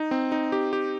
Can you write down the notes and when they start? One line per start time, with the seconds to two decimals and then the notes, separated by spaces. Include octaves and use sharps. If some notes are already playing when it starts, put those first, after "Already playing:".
Already playing: D#4
0.11 C4
0.32 D#4
0.52 G4
0.73 G4